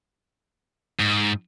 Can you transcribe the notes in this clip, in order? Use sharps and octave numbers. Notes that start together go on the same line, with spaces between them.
G#2